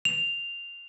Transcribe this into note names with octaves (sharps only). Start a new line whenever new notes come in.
F7